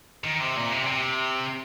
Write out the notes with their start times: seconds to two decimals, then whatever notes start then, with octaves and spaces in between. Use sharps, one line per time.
0.24 D#3
0.40 C3
0.56 A#2
0.71 C3
0.87 C3